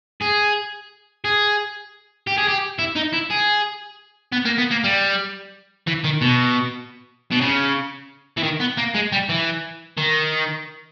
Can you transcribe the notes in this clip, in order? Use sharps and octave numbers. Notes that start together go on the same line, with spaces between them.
G#4
G#4
G4
G#4
G4
E4
D#4
E4
G#4
B3
A#3
B3
A#3
G3
E3
D#3
B2
B2
C#3
E3
D#3
B3
A#3
G#3
G3
E3
D#3